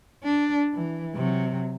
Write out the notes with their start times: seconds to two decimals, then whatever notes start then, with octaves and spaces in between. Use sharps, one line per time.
0.24 D4
0.74 E3
1.15 C3 F#3